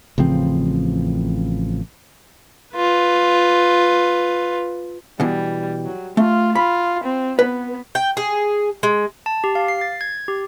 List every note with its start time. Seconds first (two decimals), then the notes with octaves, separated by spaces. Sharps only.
0.18 A1 C#3 F3 C4
2.76 F4 B4
5.20 B2 E3 G3
5.85 F#3
6.17 A3 F4
6.55 F4 B5
7.04 C4
7.39 B3 B4
7.95 G5
8.17 G#4
8.83 G#3
9.26 A5
9.44 G4
9.55 F5
9.68 C7
9.81 A6
10.01 G#6
10.28 G4